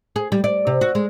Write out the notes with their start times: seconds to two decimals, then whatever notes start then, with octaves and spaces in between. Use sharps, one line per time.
0.16 G#4
0.32 G3
0.44 D5
0.67 C3
0.81 F#4
0.95 G#3